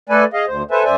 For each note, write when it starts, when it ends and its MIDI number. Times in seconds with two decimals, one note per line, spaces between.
0.09 0.24 57
0.09 0.24 69
0.09 0.24 71
0.09 0.24 74
0.09 0.24 80
0.33 0.45 68
0.33 0.45 75
0.33 0.45 77
0.48 0.63 38
0.48 0.63 72
0.71 0.84 69
0.71 0.84 71
0.71 0.84 72
0.71 0.84 76
0.71 0.84 80
0.71 0.84 81
0.84 0.96 42
0.84 0.96 72
0.84 0.96 74
0.84 0.96 76
0.84 0.96 80